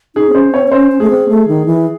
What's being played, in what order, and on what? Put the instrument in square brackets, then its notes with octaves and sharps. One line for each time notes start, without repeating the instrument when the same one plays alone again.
[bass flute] D#4 [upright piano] G#4
[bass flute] C4
[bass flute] C#4 [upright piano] C5
[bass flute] C4 [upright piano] C#5
[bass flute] C4
[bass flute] C#4 [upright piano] C5
[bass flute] C#4
[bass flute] A3 [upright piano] G#4
[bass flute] C4
A3
D#3
E3